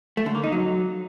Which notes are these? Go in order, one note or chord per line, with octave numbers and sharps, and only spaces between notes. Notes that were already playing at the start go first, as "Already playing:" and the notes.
A3
D3
A#3
D#4
F#3